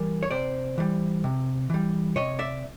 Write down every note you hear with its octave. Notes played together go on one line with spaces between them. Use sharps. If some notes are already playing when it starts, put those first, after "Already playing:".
Already playing: E3 G3 A#4
C#5
C3 C5 D5
E3 G3
C3
E3 G3
C3 C#5 D#5
D5 E5